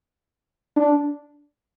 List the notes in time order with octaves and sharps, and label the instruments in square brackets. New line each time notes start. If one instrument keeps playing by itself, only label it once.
[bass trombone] D4